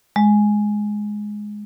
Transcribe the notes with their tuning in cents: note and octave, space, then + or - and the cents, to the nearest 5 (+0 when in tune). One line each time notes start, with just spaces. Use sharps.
G#3 +5